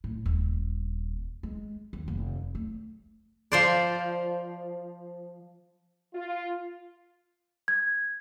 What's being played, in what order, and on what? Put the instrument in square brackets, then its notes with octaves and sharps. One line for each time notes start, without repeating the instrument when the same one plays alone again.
[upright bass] A2
D#1
G#3
D#2
F1
A3
[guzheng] F3 C5 D5
[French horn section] F4
[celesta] G#6